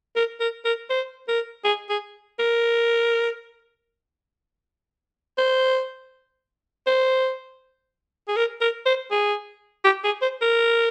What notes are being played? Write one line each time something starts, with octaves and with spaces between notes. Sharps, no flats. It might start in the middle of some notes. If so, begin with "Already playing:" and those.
A#4
A#4
A#4
C5
A#4
G#4
G#4
A#4
C5
C5
G#4
A#4
A#4
C5
G#4
G4
G#4
C5
A#4